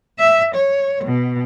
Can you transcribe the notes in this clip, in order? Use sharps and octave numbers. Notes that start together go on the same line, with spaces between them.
E5
C#5
B2